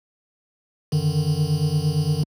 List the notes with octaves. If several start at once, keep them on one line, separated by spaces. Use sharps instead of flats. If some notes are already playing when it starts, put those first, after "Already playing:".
F#2 D3 D#3